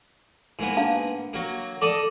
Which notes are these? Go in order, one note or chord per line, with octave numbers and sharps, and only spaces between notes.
G#2 A#3 B3
D4 F5 A5
F#3 A#3
A4 D5 D#5 D6